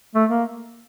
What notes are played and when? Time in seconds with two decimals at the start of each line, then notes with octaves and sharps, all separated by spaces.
0.15 A3
0.29 A#3